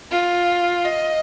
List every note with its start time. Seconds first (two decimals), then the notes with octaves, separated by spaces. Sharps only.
0.11 F4
0.85 D#5